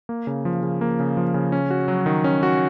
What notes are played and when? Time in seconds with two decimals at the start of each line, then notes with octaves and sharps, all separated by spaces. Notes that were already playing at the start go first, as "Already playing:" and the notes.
0.09 A#3
0.27 C#3
0.45 F3
0.63 C#3
0.81 A#3
1.00 C#3
1.17 F3
1.34 C#3
1.52 C#4
1.71 F#4
1.88 F#3
2.06 D#3
2.24 C#4
2.43 F#4